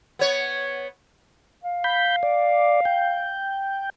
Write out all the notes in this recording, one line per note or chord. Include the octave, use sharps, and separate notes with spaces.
B3 C#5
F5
B5 G6
D5
G5